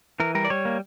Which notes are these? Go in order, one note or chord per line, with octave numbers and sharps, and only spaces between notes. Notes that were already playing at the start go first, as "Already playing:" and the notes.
E3 A#4
G3 A#4
D5
G3 C#5
A#3